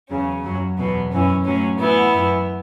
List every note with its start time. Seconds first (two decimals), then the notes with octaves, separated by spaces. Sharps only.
0.10 E2 C#3 F#3 C#4
0.45 F#2 F#3
0.78 E2 B2 F#3 B3
1.12 F#2 E3 C#4
1.46 A2 F#3 C#4
1.80 A2 E3 B3 E4
2.13 F#2 E3